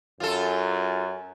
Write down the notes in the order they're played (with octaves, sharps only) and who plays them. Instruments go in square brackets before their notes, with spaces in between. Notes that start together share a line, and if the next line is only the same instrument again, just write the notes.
[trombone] F#2 [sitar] F4 A4